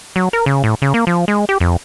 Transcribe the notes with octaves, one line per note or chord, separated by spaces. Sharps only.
F#3
A#4
C#3
A2
C#3
A#3
F3
G#3
G4
F2